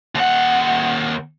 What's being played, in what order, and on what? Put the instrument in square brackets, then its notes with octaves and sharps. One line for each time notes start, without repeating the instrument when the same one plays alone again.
[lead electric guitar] D#2 F#5